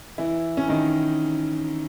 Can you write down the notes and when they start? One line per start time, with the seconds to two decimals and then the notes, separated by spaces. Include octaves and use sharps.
0.18 E3 E4
0.57 C#4
0.68 D#3 D#4